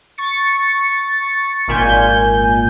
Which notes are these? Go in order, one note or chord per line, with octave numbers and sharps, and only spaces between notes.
C#6 A6 C#7
G#1 A#2 G#5 G6